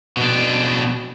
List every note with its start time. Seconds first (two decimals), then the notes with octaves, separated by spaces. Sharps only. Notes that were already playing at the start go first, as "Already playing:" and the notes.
0.17 B2 D4